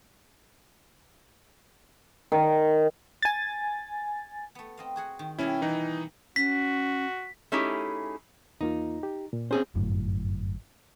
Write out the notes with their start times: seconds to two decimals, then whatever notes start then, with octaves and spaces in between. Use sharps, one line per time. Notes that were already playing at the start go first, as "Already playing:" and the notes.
2.32 D#3
3.22 G#5 A6
4.55 A3 B3
4.77 C4 D#5 F5
4.96 F#4 G#4 F#5
5.19 D#3
5.38 B2 G3 A#3 C#4 E4
5.62 E3 D#4
6.36 C#4 F#4 B6
7.52 A3 C#4 D#4 E4 G4 G#4
8.61 E2 A#3 D#4 F4
9.03 G4
9.33 A#2
9.51 C4 C#4 G#4 C5
9.76 G1 F#2 A2